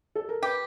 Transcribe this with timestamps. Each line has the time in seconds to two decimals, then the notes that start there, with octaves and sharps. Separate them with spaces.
0.15 A4
0.29 A#4
0.42 G4 B4